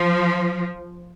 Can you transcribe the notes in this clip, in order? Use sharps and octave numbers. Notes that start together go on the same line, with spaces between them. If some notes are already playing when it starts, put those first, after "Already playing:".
Already playing: F3